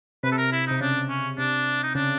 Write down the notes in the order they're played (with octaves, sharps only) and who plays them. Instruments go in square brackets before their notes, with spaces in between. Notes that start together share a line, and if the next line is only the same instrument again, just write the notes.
[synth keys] C3 [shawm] B4
[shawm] A4
A#4
E4
[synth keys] C3 [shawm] D#4
[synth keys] C#3 [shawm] D4
[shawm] C#4
[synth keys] C3 [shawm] D4
[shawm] D#4
[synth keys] C#3 [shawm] D4